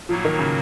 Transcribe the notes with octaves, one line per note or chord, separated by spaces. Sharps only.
A2 F3 F#3 A#3 D#4 F#4
D#3
C#3